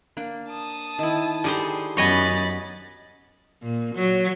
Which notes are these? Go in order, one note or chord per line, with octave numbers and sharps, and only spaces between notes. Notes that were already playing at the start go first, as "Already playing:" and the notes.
A#3 D4
A5 D#6
D#3 E4
D3 G3 G#4 C5 A#5
F#2 B3 C#5 D#5 G#5 B5 A6
A#2
F#3